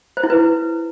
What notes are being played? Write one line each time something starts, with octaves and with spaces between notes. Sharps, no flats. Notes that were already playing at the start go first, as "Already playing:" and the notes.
C5
E4
B4